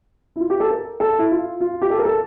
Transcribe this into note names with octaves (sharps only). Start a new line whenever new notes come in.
E4
F4
G4
A4
A#4
A4
E4
F4
F4
G4
A4
A#4
A4